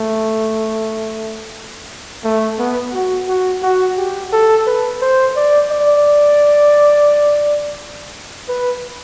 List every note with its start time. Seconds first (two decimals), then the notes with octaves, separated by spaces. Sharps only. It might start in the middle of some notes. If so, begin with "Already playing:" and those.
Already playing: A3
2.24 A3
2.59 B3
2.94 F#4
3.28 F#4
3.63 F#4
3.98 G4
4.33 A4
4.67 B4
5.02 C5
5.36 D5
5.71 D5
8.48 B4